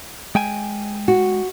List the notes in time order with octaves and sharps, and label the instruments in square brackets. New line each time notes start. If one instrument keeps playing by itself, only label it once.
[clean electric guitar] G#3 G5 G#5
[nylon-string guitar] F#4